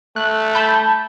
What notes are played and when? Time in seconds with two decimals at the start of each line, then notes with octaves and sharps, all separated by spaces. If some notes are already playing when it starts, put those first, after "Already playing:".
0.16 A3 F#6
0.55 A5 B5 G6